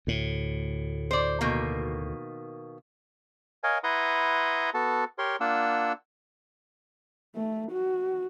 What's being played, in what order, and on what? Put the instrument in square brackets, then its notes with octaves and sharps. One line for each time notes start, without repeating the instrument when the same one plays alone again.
[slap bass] D2 A2
[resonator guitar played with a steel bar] C5 D5
B2 D#3 A#3
[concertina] A#4 C#5 D#5 F5 G#5
E4 B4 F#5 A#5 C6 D#6
B3 F#4 A4 A5
G4 A#4 C#5 C6
A#3 D4 F4 F#5 E6
[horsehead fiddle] A3
F#4